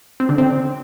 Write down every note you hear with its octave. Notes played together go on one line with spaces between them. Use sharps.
C4
D3
C4